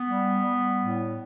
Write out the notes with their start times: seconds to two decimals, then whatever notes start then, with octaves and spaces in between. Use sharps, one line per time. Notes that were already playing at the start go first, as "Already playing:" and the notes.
Already playing: B3
0.08 G3
0.45 G3
0.81 A2